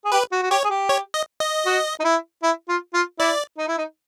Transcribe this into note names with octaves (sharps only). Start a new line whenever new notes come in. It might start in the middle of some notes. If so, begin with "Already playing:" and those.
G#4
G4 B4
F#4
F#4
G4 C#5
G#4
G4
C#5
D#5
D#5
F#4
D#4
E4
E4
F4
F4
E4 D5
D#4
E4
D#4